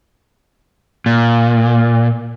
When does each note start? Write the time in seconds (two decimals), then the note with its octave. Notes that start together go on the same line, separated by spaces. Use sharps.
1.06 A#2